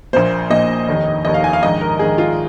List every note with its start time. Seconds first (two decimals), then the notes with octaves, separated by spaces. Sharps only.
0.13 A#1 A#2 A#3 C5
0.50 A#1 A#2 A#3 D#5
0.88 F1 D#2 D#3
1.25 F1 D#2 D#3 D#5
1.34 F5
1.44 G#5
1.53 F5
1.62 A#1 G#2 D#3 D#5
1.81 A#4
1.99 A#1 G#2 D#3 G#4
2.18 F4